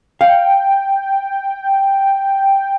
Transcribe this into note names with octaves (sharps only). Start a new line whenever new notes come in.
F5 G5